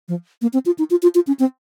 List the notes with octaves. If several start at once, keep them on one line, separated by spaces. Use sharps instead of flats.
F3
A#3
C4
F4
D#4
F4
F4
F4
C#4
C4